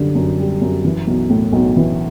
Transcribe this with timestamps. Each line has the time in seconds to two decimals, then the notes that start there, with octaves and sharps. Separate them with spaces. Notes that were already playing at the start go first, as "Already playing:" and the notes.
Already playing: F#2 D3 G3
0.15 F#2
0.39 G3
0.62 F#2
0.85 E3
1.07 B1
1.30 A2
1.53 B1
1.77 E3